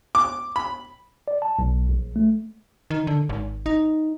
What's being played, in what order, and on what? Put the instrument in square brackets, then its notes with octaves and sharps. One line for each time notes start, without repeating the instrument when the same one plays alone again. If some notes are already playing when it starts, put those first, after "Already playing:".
[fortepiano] D6
B5
[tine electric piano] D5
A5
B1
A#1
A3
[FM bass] D#3
D3
G#1
D#4